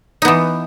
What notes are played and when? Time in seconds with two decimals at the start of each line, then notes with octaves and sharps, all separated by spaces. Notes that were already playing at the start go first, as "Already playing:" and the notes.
0.22 D#4
0.25 B3
0.28 E3